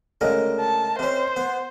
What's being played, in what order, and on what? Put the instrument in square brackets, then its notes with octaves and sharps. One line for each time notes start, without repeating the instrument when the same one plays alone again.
[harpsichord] D2 C#3 G#3 [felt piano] A#4 D#5
[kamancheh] A5
[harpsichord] C3 C#4 [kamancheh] C5
[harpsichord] B3